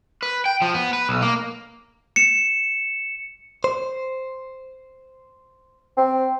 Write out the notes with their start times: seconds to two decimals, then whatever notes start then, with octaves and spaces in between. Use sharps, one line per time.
0.23 B4
0.46 G5
0.62 F3
0.74 B3
0.93 B4
1.09 B1
1.22 A#3
2.16 C#7 E7
3.64 C5
5.97 C4